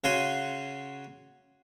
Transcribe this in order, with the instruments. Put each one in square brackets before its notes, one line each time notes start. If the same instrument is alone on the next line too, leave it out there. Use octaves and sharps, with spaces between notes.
[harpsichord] C#3 F#4 C#5 F#5 G#5 C6